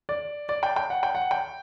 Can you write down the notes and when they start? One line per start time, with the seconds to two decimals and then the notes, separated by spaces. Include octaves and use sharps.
0.09 D5
0.49 D5
0.63 G5
0.76 G5
0.90 F#5
1.03 G5
1.15 F#5
1.31 G5